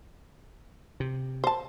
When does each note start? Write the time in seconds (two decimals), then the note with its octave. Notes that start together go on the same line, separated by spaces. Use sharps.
1.00 C3
1.44 C5 A5